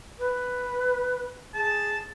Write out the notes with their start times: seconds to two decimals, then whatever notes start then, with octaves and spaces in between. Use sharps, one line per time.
0.19 B4
1.54 G#4 A5